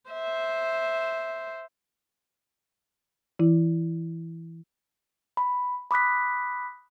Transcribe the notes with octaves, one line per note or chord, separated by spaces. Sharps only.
C5 E5
E3 E4
B5
B5 D6 D#6 F#6 B6